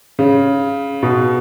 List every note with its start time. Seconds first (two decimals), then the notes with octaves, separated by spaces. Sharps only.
0.19 C#3
1.03 B2